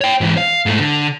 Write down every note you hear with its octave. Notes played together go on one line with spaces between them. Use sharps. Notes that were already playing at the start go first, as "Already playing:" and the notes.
C#5 G5
G#2 E3
F5
G#2 A3
D3